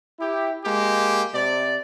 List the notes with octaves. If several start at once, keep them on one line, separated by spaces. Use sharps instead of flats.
E4 G4
G#3 A#3 G4
C3 D5